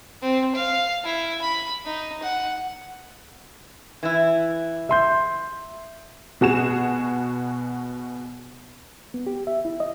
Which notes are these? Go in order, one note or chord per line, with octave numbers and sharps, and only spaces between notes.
C4
F5
E4
B5
D#4
F#5
E3 E4
E5 C6 G6
B2 F#4 G#4 E7
B3
G4
E5
E4
D#5